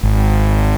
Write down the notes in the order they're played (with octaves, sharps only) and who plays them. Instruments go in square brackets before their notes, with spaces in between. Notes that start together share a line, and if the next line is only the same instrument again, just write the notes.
[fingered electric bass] G#1